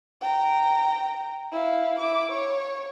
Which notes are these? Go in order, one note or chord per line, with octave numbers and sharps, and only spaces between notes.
G5 A#5
E4 F5
E4 D6
C#5 C#6